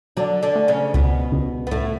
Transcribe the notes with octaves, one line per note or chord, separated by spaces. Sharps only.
D3 F#3 D4
D3 D4
A3
C#3 C#4
C#2 B2 B3
C#2
B3
C#2 A2 A3